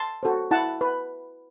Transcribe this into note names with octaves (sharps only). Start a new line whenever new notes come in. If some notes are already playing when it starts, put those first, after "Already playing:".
Already playing: A5 C6
F#4 A4 C5
E4 F#5 A5
B4